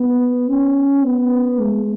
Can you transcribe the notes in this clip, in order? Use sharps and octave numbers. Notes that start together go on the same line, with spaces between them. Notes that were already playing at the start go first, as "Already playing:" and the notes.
Already playing: B3
C#4
B3
G#3